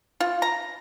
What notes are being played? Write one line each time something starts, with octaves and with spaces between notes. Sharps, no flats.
F4
A#5